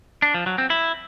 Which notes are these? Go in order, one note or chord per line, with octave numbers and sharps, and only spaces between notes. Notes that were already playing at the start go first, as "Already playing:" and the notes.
D4
F3
F#3
C4
E4